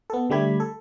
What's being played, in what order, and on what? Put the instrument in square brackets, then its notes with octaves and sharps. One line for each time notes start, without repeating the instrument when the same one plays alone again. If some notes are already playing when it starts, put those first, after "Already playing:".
[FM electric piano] B3 A4
D3 G3 A3 G4 B5 G#6
A4